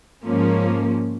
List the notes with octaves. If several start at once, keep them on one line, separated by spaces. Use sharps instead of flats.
G#2 F3 A#3 C#4